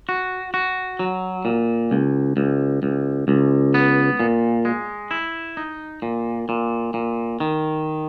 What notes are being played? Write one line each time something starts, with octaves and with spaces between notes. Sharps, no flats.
F#4
F#4
F#3
A#2
C#2
C#2
C#2
C#2
B3
A#2
G#3
E4
D#4
A#2
A#2
A#2
D#3